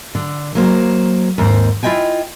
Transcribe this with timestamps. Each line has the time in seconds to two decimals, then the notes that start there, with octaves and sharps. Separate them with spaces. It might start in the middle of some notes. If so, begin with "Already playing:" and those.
0.15 D3
0.55 F#3 A#3 C5
1.38 D#2 G#2 C4 C5
1.83 E4 F4 D#5 G5 G#5